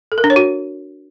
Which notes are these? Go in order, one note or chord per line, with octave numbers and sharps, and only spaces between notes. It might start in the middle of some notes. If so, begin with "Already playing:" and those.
A4
A#4
D4
C#5
F#4